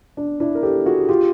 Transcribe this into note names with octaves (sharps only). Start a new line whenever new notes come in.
D4
D4 E4
A#4
G4 A4
F#4 G#4
F4 G4